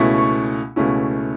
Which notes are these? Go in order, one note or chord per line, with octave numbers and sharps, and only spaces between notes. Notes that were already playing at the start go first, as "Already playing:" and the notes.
Already playing: C#2 B2 A3 C#4 E4
C#6
C#2 B2 A3 C#4 E4